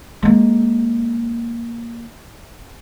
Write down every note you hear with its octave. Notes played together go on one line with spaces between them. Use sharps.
G#3 A#3